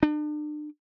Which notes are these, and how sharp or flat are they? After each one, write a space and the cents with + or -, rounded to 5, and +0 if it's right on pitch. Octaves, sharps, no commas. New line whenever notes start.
D4 +40